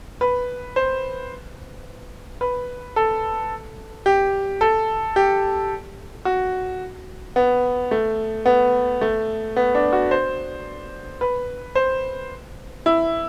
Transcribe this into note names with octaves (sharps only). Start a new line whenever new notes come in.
B4
C5
B4
A4
G4
A4
G4
F#4
B3
A3
B3
A3
B3
D4
F#4
C5
B4
C5
E4